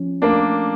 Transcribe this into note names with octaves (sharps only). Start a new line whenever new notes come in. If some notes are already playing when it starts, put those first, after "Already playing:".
Already playing: F3 C#4
A3 A#3 D4